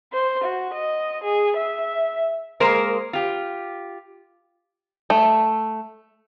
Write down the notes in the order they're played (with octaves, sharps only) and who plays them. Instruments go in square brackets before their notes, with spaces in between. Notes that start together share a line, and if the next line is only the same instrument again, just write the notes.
[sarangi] C5
F#4
D#5
G#4
E5
[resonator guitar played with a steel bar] G#3 A#3 A#4 C5
F4 G4
[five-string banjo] A3